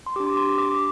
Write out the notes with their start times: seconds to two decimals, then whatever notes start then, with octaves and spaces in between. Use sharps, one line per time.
0.06 C6
0.16 G4 D6
0.20 D4
0.26 C6
0.37 C6
0.47 D6
0.58 D6